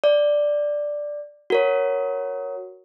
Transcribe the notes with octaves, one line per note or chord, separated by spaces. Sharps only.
D5
F#4 A#4 C#5